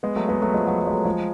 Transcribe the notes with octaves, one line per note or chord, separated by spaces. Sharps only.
G#3 B3
F#3 A3
G#3 B3
F#3 A3
F3 G#3
F#3
F#3
G#3
F#3 A3
F3 G#3